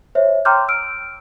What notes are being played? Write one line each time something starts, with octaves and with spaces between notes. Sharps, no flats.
C5 C#5 E5
G5 A#5 C6 D6 F6 G6
E6 F6 D7